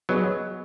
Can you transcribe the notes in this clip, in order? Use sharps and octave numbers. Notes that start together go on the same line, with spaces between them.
F#3 B3 G#4 D#5